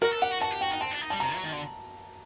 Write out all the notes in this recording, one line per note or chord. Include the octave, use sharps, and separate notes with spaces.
F#4 A#4
A4
G4 F#5
F#4
F#4 A5
G4
F#4 G5
D#4
C4 A5
D4
D#4
G3 A5
C3 A#5
F#3
D#3
D3